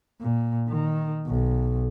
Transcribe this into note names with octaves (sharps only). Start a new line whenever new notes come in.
A#2
D#3
B1